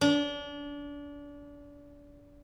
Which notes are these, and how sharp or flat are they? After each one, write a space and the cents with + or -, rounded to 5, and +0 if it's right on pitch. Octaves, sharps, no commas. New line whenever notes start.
D4 -30